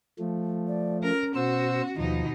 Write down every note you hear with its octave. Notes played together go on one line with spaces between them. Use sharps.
F3 A3
D5
C#4 A#4
B2 F#4 C5 E6
D#2 B2 F3 D#4